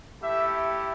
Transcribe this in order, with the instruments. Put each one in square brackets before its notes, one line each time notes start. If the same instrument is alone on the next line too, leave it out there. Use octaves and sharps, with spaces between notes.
[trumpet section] A3 E4 G4 E5